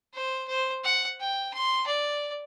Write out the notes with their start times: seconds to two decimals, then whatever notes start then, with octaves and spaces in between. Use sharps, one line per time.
0.14 C5
0.48 C5
0.84 F#5
1.20 G5
1.54 C6
1.87 D5